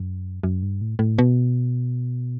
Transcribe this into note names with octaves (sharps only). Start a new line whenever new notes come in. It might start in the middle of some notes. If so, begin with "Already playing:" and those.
Already playing: F#2
F#2
G2
A2
A2
B2